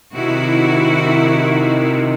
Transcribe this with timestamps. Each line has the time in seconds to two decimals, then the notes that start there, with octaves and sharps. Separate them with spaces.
0.14 C3 D#3 E4 F#4